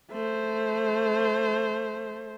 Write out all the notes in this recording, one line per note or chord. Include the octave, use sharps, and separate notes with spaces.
A3 C5